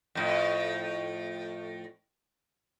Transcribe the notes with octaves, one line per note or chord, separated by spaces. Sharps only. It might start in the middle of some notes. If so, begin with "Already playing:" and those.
F2 A2